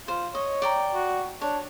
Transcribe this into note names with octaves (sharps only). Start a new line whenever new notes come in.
F4 C5
C#5 D#5
D5 G5 A#5
F#4
D4 C#5